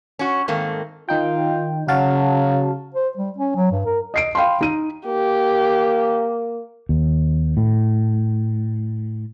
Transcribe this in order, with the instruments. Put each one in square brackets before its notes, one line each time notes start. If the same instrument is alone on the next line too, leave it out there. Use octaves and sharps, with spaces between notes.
[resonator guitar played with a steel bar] C#4 F#4
G#2 D#3 A3 A#3 C4
[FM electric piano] D#3 D#4 G5 [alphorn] F4
[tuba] C#3 [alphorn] F#3 [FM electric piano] F#4 F5 A5
[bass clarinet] C5
G3
C#4
F#3
G2
A#4
[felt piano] D#5 C7 D7
F5 G5 B5 C6
D#4 D#7
[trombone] A#3 [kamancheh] G4
[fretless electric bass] D#2
A2